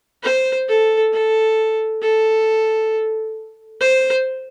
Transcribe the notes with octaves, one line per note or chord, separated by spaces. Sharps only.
C5
A4
A4
A4
C5